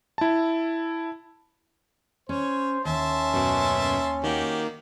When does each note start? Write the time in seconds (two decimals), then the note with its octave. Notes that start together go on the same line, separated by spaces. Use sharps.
0.18 E4 A5
2.29 C#4 C5 C#5
2.85 D#2 C#4 E5 A5 C6
3.33 F#2 B2
4.24 D#3 A#3 F#4 G4